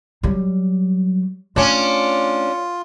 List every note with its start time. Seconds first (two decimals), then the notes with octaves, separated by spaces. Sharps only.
0.23 F#3 G3
1.56 A3 C#4 D4 F4